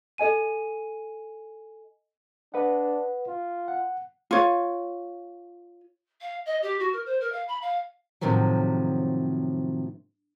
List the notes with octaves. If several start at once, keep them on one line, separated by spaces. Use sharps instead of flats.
A4 D#5 G#5 D#7
D4 B4 D#5 F#5
F4
F#5
F4 C#5
F5
D#5
G4
F#4
A#4
C5
A#4
F5
B5
F5
A2 C3 D#3 F3 F#3